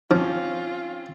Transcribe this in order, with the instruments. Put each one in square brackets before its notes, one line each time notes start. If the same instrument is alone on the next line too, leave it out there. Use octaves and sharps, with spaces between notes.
[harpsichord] F3 [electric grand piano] C4 C#4 [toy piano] D#4 [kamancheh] F4